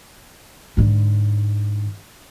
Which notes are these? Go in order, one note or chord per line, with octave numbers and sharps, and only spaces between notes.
G#2 D3